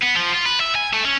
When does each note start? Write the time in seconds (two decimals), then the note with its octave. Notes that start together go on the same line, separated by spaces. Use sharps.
0.03 B3
0.16 F3
0.32 F4
0.46 B4
0.60 E5
0.75 G#5
0.93 A3
1.05 C#4